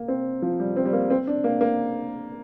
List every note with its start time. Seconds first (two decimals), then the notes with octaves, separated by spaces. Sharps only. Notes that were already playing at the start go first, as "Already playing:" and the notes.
Already playing: A#3
0.08 C4
0.42 F3
0.60 G3
0.76 C4
0.85 G3
0.93 A#3
1.10 C4
1.27 D4
1.44 A#3
1.61 A#3